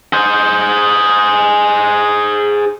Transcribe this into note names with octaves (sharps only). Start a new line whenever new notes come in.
G#4 C5